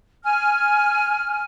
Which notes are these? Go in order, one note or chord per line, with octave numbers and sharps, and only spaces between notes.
G#5 F6